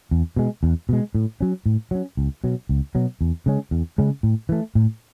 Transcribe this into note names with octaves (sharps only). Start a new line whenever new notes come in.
E2
B2 G#3
E2
B2 G#3
A2
F#3 C#4
A2
F#3 C#4
C#2
B2 F#3
C#2
B2 F#3
E2
C#3 G#3 C#4
E2
C#3 G#3 C#4
A2
E3 A3
A2